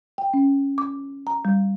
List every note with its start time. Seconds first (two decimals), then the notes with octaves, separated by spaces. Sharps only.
0.18 G5
0.34 C#4
0.78 D6
1.27 A#5
1.45 G3